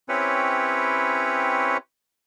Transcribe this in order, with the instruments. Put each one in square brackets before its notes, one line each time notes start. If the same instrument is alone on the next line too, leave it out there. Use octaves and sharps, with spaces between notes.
[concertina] C4 C#4 E4 G4 B4 C#5